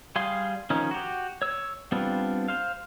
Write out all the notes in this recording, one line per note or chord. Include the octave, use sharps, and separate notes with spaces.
G3 G#4 F5 C6
D#3 F3 C#4 D#4
F#4 G4
C#5 E6
G3 B3 C4 D4 F4
C5 F5